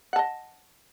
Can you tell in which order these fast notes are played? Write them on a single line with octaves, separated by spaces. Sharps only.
F#5 A5 D#5